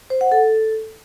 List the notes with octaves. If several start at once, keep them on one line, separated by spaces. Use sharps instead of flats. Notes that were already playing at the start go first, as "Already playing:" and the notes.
C5
F#5
A4